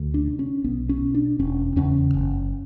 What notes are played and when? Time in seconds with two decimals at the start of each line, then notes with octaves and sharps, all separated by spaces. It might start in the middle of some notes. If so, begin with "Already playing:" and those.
Already playing: D2
0.14 D4
0.27 C3
0.39 C#4
0.64 B1 B3
0.89 C#4
1.01 B2
1.15 D4
1.39 E1 C#4
1.76 E2 C#3 C#4
2.14 F#1